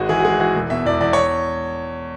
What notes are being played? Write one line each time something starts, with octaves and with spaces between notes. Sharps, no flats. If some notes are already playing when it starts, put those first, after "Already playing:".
Already playing: G#1 G#3 F#4
E3 G#4
F#4
G#3 G#4
E3 F#4
E1
B2 E5
E2 D5
E2 D5
C#5